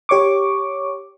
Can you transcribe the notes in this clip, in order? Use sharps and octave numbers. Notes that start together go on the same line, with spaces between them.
G4 C#5 C#6 D6